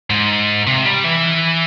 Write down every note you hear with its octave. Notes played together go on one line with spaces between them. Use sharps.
G#2
C3
G3
E3